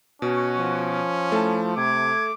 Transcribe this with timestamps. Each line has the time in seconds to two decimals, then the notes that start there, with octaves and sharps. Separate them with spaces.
0.22 B2 C#4 F#4
0.58 F3
1.32 A3 E4 A5
1.77 C3 D6 G#6